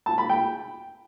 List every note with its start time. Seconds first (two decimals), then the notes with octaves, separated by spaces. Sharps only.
0.06 A5
0.18 B5
0.29 G5